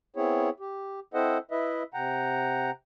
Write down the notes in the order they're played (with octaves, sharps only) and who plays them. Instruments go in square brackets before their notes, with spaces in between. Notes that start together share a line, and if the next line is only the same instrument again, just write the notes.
[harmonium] B3 C4 E4 G#4 C#5
G4
C4 E4 A4 C5 D#5 F#5
E4 B4 D#5 E5
C3 F#5 G5 A#5